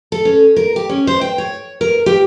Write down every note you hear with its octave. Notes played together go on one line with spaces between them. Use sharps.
A4
C#4
A#4
G4
C#4
C5
G5
C#5
A#4
G4